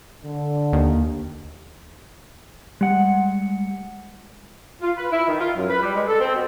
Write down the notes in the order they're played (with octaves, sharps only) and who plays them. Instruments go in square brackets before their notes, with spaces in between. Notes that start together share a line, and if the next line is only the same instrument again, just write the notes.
[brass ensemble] D3
[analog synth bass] D#2
[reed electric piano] G3 [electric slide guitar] G#3 F#5
[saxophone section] F4
B4
E4
D#3
F4
F#2
B4
G3
G#3
A4
C4
B2